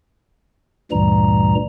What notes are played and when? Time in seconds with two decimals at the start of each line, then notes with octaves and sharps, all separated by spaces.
0.91 D2 G2 A#2 E3 G3 A#5